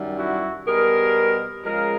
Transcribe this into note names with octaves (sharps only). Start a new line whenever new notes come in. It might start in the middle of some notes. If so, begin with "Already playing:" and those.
Already playing: F#2 D#3 G3
E4 F#4
B2 G3 G#4 A#4
C#3 F3 G#3 G#4 A#4